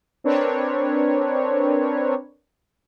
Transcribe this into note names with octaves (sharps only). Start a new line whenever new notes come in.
C4 D4 A#4 B4 C#5